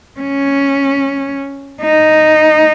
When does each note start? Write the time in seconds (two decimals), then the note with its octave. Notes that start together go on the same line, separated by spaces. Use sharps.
0.20 C#4
1.82 D#4